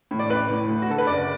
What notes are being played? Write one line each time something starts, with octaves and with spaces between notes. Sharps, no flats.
A2 E3
D5
A1 B4
A2 E3
D2
F#4
D3 A4
B4
F#1 D5